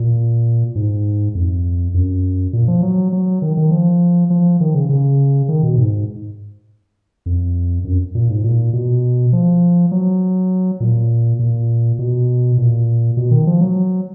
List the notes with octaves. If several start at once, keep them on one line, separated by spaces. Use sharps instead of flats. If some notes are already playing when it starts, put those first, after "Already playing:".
Already playing: A#2
G#2
F2
F#2
A#2
F3
F#3
F#3
D#3
D#3
F3
F3
D#3
C#3
C#3
D#3
B2
G#2
F2
F#2
A#2
G#2
A#2
B2
F3
F#3
A#2
A#2
B2
A#2
B2
D#3
F3
F#3